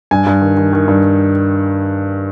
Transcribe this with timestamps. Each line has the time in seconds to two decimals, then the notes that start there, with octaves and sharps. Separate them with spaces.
0.11 G2 G#5
0.26 G2
0.41 D#3
0.57 D#3
0.73 D#3
0.88 G2